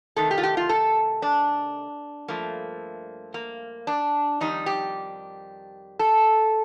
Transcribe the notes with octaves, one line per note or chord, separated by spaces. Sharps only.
C3 D#3 A3 A4
G4
F4
G4
F4
A4
D4
G2 F3 A3 A#3
A#3
D4
F2 D#3 G3 D#4
G4
A4